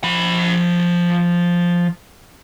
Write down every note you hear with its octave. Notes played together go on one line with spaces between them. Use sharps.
F3 B5